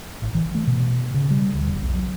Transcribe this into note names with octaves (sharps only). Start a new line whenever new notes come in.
A1
E3
A3
B2
C#3
G3
D2
E1
B1
F#3